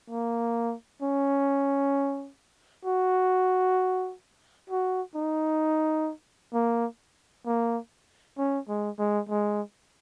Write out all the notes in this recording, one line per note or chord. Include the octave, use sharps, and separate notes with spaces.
A#3
C#4
F#4
F#4
D#4
A#3
A#3
C#4
G#3
G#3
G#3